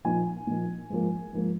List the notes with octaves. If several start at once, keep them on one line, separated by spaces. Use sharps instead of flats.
A#2 F3 A#3 D#4 G#5
A#2 F3 A#3 D#4
G#2 F3 A#3
G#2 F3 A#3